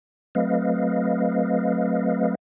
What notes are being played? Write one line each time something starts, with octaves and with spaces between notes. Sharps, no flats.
F#3 A3 C4 B4 D#5 F5